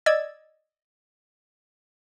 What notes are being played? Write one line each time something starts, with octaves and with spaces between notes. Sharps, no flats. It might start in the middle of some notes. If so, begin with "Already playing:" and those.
D5 D#5 E6 G#6 A6